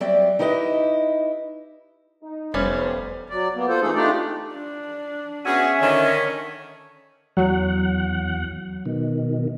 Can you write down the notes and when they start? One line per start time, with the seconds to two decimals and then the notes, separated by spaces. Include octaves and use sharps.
0.01 F#3 G3 C4 D5 E5
0.39 D#4 E4 G4 B4 D5 D#5
2.23 D#4
2.54 F1 F3 G3 A3 B3 C#4 C5
3.30 F#3 D5
3.55 A#3 B3
3.68 F4 A4 C5
3.81 C3 E3 A3 D#4 G#4 A4
3.95 A3 D4 D#4 F4 G4 D5
4.53 D4
5.45 B3 C#4 F#4 G#4 E5 G#5
5.80 D3 D#3 C#5
7.37 E2 F#3 F#5
8.86 B2 D#3